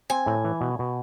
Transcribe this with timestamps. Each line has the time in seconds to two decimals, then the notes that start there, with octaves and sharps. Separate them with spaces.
0.10 C4 G#5
0.26 A2
0.44 E3
0.61 B2
0.79 B2